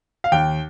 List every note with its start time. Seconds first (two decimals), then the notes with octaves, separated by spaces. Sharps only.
0.24 F5
0.32 D#2 G5